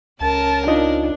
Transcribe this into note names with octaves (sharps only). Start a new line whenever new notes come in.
C#2 C#4 A#4 A5
D4 D#4 F4 D#5